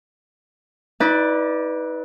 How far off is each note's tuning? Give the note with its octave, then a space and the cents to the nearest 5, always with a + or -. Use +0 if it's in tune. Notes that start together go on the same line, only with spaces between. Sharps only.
D#4 +45 B4 +0 D5 +5